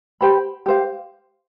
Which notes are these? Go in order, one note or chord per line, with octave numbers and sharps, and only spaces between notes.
G4 C5 G5 B5
G4 C5 F5